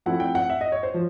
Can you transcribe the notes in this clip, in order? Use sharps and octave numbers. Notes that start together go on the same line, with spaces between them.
F3 A3 C4 E4 F#5
G5
F#5
E5
D#5
C#5
C5
F3